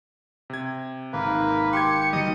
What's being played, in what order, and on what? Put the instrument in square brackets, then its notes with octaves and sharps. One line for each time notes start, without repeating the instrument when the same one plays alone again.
[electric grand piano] C3 G#6
[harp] G#1 [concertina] A#3 B4
[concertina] G4 [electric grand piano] C6 D6 G#6 [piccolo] C#7
[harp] D#3 F#3 A#3 [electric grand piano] G3 [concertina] D#5 D#6